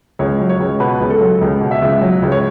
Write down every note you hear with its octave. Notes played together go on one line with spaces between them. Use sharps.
C#2 C#5
F#3
C#5
C#2
B2 B4
C#2
A4
F#3
C#2
B2
E5
C#2
F#3
C#2
C#5